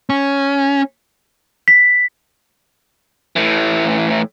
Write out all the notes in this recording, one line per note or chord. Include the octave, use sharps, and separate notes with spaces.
C#4
B6
A2 E3